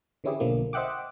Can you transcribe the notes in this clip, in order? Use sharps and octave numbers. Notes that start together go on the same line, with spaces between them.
D3 E3 C#4 E4 G4 G#4
B1 D3 F3 A#3
C5 D#5 E5 F#5 G5 D6